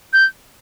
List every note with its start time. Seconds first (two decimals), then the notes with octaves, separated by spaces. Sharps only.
0.13 G6